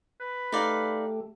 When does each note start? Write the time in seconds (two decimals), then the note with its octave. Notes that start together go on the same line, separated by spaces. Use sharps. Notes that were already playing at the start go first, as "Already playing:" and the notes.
0.20 B4
0.52 A3 D#4 G4 A4 D5 F5